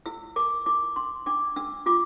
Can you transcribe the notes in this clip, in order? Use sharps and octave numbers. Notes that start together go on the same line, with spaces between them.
E4 E6
A#4 D6
E4 D6
D4 C6
D4 D6
D4 E6
F4 D6